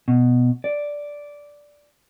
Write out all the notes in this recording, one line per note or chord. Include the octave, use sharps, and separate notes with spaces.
B2
D5